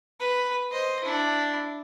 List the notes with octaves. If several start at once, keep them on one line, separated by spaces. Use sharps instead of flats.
B4
C5 D#5
D4 E4